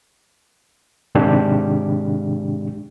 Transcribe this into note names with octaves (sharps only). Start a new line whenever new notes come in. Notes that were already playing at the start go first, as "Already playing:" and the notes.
G#2 C3 D#3 G#3 D4 G4